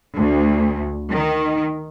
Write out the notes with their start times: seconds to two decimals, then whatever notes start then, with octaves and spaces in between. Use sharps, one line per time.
0.17 D2
1.12 D#3